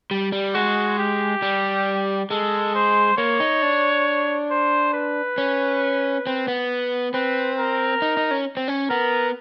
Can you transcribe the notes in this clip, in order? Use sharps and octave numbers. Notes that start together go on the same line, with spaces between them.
G3
G3
G#3 F#4
G4
G3
G#3 A4
C5
A#3 C#5
D#4
D4
C5
B4
C#4
C4
B3
C4 B4
A#4
D#4
D#4
C#4
C4
C#4
B3 A#4